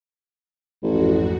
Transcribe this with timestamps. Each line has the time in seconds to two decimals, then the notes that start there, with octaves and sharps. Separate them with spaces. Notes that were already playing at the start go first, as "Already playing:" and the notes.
0.83 A1 F2 G#2 F#4